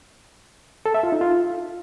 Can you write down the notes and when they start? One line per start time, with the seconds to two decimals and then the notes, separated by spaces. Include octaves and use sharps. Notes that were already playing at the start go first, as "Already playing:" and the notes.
0.86 A4
0.94 E5
1.03 F4
1.12 D#4
1.21 F4